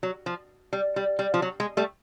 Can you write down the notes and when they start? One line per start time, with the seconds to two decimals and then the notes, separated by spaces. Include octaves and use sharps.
0.03 F#3
0.26 F3
0.73 G3
0.96 G3
1.19 G3
1.34 F3
1.42 F#3
1.60 G#3
1.77 G3 A3